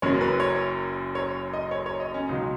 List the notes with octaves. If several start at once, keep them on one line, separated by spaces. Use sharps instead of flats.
F#1 F#2 F#3 C#5
B4
C#5
C#5
D#5
C#5
C#5
D#5
C#4
C#2 B2 F#3 D#4